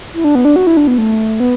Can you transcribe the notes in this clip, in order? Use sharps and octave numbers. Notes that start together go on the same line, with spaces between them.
E4
D4
B3
D4
F#4
E4
D4
B3
A3
B3